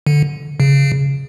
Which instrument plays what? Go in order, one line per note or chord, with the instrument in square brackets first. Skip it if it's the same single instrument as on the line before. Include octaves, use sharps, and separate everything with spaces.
[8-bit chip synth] D3
C#3